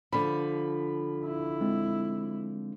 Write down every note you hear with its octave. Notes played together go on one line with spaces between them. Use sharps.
D3 F3 B5
E4
G#3 C4